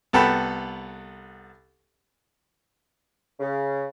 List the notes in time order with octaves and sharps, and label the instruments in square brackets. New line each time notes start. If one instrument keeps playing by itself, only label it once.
[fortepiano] C2 B3 A4 F#5 G5 B5
[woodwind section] C#3